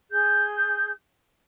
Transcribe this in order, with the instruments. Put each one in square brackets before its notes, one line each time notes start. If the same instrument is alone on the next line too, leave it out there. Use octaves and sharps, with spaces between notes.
[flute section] G#4 G6